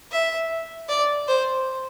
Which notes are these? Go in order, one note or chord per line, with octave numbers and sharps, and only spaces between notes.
E5
D5
C5